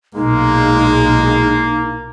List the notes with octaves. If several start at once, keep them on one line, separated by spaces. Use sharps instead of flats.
B1 A#2 G#3 A#3 D#4